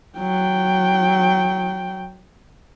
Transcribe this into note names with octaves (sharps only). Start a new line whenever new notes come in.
F#3 G5